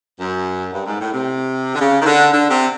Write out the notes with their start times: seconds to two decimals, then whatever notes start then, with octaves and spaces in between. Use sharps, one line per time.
0.19 F#2
0.73 G2
0.85 G#2
1.00 A2
1.13 C3
1.75 D3
1.80 C#3
2.01 D#3
2.06 D3
2.32 D3
2.50 C3